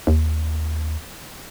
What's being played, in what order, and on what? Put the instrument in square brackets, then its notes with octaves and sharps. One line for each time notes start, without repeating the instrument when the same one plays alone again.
[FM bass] D#2